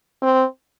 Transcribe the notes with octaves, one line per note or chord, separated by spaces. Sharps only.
C4